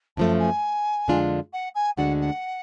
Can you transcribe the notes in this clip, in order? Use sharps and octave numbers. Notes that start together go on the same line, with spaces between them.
F#2 F3 A3 A5
G#5
F2 D3 G#3 D4 F4
F#5
G#5
D2 D3 G#3 D4 F#4 F#5
F#5